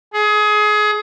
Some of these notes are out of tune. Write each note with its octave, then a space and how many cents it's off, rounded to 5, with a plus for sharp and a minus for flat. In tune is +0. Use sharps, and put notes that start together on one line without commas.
G#4 +25